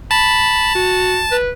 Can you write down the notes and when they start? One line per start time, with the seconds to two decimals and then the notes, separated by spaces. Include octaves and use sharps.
0.11 A5 B5
0.75 F#4
1.32 B4